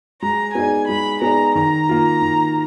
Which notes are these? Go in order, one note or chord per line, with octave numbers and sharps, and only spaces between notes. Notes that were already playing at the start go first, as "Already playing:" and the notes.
G#3 A#5
B3 D#4 G#4 D5 G#5
G#3 B5
B3 D#4 G#4 D5 A#5
D#3 A#5
A#3 F4
D#3